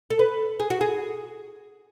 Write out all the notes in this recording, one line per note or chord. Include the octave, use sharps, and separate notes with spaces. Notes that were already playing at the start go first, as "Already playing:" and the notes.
A4
B4
G#4
F#4
G#4